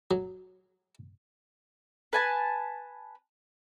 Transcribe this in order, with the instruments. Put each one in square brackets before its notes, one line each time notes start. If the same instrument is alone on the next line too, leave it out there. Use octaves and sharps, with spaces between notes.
[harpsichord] F#3
[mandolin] B4 G#5 A5